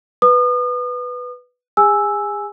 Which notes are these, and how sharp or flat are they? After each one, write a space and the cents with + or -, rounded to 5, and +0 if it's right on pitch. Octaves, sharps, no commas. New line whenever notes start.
B4 +0 D#6 -40
G#4 -40 G#5 +5 E6 -5